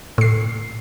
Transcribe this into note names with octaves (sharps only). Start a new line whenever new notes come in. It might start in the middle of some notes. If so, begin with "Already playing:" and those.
A2 C7